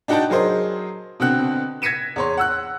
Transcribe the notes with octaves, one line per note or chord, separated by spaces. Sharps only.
D4 D#4 F#4 F#5 G5 A5
F#3 G#4 A#4 C5 D#5
B2 D3 C4 F#5 F#6
G#6 A#6 B6 C#7 D#7 E7
E2 C#5 C6
F#5 E6 F#6